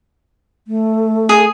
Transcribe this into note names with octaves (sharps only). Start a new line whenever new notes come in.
A3
G#4